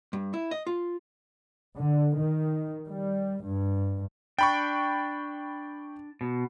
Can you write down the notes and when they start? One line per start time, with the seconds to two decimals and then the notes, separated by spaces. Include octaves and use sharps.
0.13 G2
0.34 E4
0.51 D#5
0.67 F4
1.77 D3
2.18 D#3
2.88 G3
3.45 G2
4.39 D4 G5 B5 C#6
6.21 B2